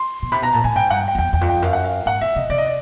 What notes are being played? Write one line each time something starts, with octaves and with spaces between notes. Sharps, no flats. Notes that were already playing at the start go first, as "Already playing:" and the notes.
Already playing: C6
B2
C3 B5
B2 A#5
A#2 A5
A2 G#5
G#2 G5
G2 F#5
G5
G5
F2
E2 G5
E2 G5
F2
G5
F#2 F5
F#5
F5
G#2 F#5
C3 E5
C3 D#5
C3 D5
D#5
D5